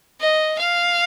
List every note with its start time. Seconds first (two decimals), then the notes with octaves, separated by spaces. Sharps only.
0.21 D#5
0.59 F5